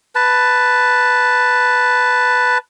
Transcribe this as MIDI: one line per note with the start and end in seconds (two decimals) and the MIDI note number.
0.15 2.58 71
0.15 2.58 81